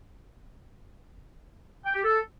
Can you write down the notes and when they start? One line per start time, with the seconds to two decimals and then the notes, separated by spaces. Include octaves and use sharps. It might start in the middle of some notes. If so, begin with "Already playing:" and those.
1.85 G5
1.95 G4
2.04 A4